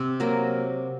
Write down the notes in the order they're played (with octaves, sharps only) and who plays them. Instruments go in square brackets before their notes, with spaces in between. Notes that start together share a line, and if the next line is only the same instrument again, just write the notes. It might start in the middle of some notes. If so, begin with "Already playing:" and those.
Already playing: [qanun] C3 C4 C5
F#3 A#3 A#4